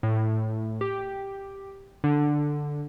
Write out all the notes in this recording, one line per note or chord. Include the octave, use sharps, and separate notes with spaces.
A2
G4
D3